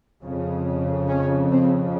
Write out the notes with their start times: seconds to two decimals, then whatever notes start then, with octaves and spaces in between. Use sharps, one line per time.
0.23 F2 C#3
1.07 C#4
1.50 C4